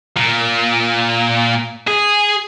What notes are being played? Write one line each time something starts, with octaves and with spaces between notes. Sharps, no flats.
A#2
G#4